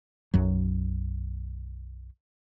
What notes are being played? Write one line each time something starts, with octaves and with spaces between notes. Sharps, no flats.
B1 F#2 F#3